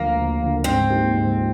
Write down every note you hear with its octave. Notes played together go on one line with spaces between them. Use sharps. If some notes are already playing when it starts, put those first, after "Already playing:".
Already playing: D2 D3 F3 A#3
D2
D3 F3
G#2 C4
F3 A#3 D#4 G4
G#2
F3